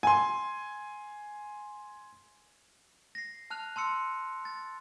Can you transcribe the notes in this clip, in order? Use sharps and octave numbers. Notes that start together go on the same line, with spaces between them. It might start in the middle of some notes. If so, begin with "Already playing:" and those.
G#5 C6
A#6 C7
A5 F6 F#6 F7
A5 C6 E6 C#7
A6